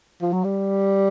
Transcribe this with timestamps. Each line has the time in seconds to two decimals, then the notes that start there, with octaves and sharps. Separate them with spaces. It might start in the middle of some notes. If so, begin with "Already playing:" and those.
0.22 F3
0.33 F#3
0.44 G3